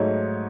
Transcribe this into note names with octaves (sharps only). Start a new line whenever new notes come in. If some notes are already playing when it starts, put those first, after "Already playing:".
Already playing: G#2 F#3 A3 D#4 C#5